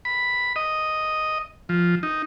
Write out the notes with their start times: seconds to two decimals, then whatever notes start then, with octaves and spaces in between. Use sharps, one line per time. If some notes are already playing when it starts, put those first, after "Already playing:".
0.05 B5
0.56 D#5
1.69 F3
2.03 D#4